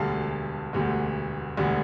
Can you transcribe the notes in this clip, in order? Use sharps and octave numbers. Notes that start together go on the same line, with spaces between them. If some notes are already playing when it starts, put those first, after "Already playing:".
Already playing: E1 D2 D3 G3 F5 A5
E1 D2 D3 G3
E1 D2 D3 G3